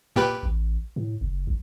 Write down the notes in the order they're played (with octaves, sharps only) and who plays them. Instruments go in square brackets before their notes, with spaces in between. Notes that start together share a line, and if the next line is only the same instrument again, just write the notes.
[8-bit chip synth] A#2 G4 B4
[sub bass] A1
A2
F#1
A#1